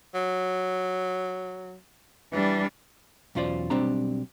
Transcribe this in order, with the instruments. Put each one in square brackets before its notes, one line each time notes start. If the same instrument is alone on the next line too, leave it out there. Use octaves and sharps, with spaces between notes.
[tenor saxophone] F#3
[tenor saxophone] E3 [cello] G3 D4
[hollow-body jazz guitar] B1 E2 C#4 F4 C5 D5
B1 G3 C4 D4 G4 A#5